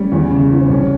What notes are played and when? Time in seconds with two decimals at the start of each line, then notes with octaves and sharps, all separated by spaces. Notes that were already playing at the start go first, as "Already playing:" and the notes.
Already playing: G3 C#4
0.12 E2
0.31 C#3
0.50 E3
0.61 C4
0.69 C2 C#4